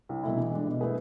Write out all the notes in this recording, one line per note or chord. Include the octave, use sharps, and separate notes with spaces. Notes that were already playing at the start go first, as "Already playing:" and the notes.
C2
B2 A3 E4
E3
G#3 D4
B2
A3 E4 G#4 B4